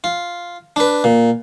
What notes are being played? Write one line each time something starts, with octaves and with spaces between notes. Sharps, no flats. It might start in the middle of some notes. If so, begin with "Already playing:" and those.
F4
D4 B4
A#2